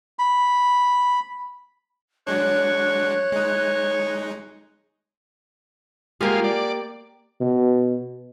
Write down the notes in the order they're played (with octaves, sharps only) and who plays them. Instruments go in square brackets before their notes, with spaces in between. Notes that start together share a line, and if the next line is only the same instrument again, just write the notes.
[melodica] B5
[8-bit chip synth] F#3 G#3 D4 [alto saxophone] C#5 [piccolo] F#6
[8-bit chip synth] G#3 D#4
[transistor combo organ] G#3 F4 [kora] A#3 G4
[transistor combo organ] D5
[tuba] B2